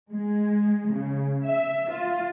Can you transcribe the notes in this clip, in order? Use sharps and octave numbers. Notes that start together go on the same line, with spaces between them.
G#3
C#3
E5
F4